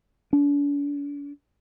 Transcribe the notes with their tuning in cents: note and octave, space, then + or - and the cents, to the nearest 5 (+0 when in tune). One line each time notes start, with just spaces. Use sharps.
D4 -45